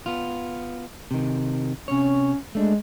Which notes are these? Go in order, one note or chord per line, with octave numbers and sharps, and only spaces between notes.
B3 F4
C3 D#3
C3 C#4 C#5
G#3 A3 D4